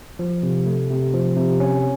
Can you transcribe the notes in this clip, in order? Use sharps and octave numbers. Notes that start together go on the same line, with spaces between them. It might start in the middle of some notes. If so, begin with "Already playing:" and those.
F3
C3
A3
C3
F3
C3
C#4